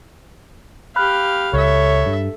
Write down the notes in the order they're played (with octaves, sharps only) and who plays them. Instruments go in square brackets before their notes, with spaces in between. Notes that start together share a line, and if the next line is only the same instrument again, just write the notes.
[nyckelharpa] G4 F5 [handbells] B5 F6 F#6
[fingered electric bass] C#2 [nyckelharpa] A4 E5 [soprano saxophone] C#5
[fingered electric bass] G2